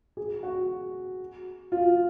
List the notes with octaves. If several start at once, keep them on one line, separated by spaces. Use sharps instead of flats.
G#4
F#4
F4